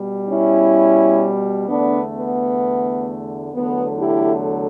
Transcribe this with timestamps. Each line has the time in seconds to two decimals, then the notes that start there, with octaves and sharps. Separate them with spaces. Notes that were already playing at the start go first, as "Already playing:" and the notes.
Already playing: B2 G3
0.28 C#4 E4
1.67 E2 D3 A3 B3 D4
2.13 B3
3.52 E2 D3 F#3 A3 B3
3.98 E4 G4